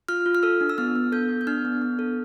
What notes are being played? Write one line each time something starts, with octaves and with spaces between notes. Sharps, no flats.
F4 F6
F4
F6
A4 E6
D4
E6
B3 F6
B3
A4 G6
B3
G6
D4 F6
B3
B3
A4